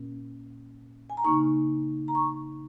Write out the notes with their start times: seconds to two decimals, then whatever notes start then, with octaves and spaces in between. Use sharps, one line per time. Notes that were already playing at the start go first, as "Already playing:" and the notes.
Already playing: A#2 A#3 C#4
1.10 G#5
1.17 A#5
1.24 C#3 A#3 D#4 C#6
2.08 A#5
2.15 C#6